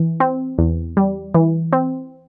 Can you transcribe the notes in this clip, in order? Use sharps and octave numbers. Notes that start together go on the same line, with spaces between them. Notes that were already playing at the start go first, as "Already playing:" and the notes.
Already playing: E3
C4
E2
G3
E3
C4